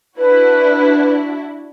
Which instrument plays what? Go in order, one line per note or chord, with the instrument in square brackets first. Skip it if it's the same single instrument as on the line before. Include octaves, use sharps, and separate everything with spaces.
[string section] D4 E4 F#4 [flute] B4